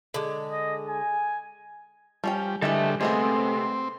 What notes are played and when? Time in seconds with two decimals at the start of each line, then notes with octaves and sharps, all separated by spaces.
0.14 D3 G#3
0.51 D#5
0.88 G#5
2.24 F3 G3 C#4 G5
2.62 D3 E3 G3 G#3 A4 E5
3.01 C3 G#3 A3 B3 C4 G#4